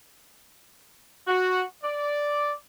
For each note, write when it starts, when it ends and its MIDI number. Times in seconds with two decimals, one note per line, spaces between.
1.27 1.63 66
1.83 2.54 74